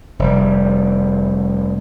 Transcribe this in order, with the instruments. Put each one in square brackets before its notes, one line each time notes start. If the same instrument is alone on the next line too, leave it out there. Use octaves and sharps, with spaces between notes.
[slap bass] F1 G3